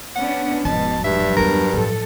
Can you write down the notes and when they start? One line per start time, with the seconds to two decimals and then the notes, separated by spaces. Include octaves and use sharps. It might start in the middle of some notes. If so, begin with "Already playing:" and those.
0.16 B3 C#4 D4 F#5
0.65 E1 G#2 B2 F3 A5
1.04 G2 F#3 D4 E5
1.37 E2 G3 A#4
1.73 A2 F3 A4